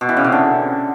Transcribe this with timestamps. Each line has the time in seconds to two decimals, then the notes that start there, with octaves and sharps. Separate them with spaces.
0.01 B2
0.09 E3
0.17 C#3
0.24 C3
0.32 D3